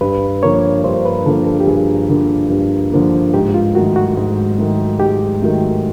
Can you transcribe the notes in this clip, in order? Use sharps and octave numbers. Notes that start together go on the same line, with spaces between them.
G2 B4
D3 F3 A#3 C#5
G2 C5
B4
D3 F3 A#3 A4
A4
G4
G2 G#4
D3 F3 A#3
G2
D3 F3 A#3
G#2 G4
F4
D#3 F#3 A3 F#4
F#4
G#2
D#3 F#3 A3
G#2 G4
D#3 F#3 A3